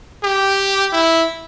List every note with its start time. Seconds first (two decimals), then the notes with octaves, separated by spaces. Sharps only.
0.23 G4
0.93 E4